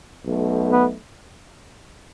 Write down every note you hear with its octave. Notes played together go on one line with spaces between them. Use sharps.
B1 B2 A3
B3